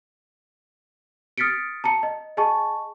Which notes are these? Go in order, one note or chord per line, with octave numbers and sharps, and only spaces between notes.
D#6 F6 A6 B6 C#7 D7
A5 A#5 C#7
D#5
G#4 D#5 G#5 A5 C#6